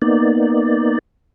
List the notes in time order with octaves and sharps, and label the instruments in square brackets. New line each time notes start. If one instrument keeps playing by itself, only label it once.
[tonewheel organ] A#3 B3 D#4 D5